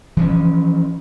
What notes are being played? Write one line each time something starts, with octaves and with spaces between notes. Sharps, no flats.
E3 F3 C#4